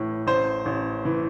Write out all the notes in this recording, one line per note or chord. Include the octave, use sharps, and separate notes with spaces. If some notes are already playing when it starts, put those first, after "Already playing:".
Already playing: A1 A2 E3
A1 C5
A1
E3